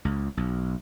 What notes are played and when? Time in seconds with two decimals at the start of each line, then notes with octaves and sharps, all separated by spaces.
0.05 C#2
0.37 B1